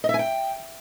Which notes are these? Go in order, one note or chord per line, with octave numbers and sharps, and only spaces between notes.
D#5
E5
G#5
G5